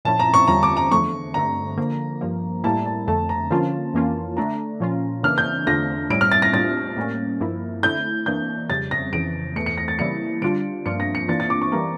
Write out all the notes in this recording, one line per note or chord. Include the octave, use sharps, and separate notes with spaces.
A#2 F3 C#4 E4 A5
A#5
C#6
E2 D3 G3 C#4 F4 A#5
D6
A#5
E2 D3 F3 A3 C#6
G2 D3 A3 A#5
D3 F3 A#3
G2 F3 A#3
A2 G3 A#3 E4 A5
A5
F2 D3 A3 A5
A#5
D3 F3 A#3 C#4 F4 A5
F2 E3 A#3 C#4 F4
D3 A3 D4 A#5
A#2 F3 C#4 F4
C#3 E3 A#3 D4 F6
G6
E2 D3 A3 D4 F4 A#6
A2 G3 C#4 E4 D7
F6
A6
A#6
A2 G3 D4 F4 A6
A2 G3 A#3 C#4
G2 F3 A#3 E4
D3 A3 E4 G6
E3 A#3 D4 G6
F2 C#3 G3 A6
A#6
F2 C#3 E3 D7
E2 E3 A3 C#7
C#7
A#6
A6
C#3 E3 G3 A#3 E4 C#7
D3 G3 D4 F4 D7
G2 F3 A#3 D4 F4 C#7
A#6
C#7
E3 A#3 D4 F4 A6
A6
D6
C#6
E3 G3 A#3 D4 A#5